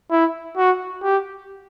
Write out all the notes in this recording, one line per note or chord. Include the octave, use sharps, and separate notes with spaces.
E4
F#4
G4